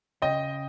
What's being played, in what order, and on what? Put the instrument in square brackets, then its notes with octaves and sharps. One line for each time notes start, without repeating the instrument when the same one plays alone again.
[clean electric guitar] C#3 [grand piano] D#5 G5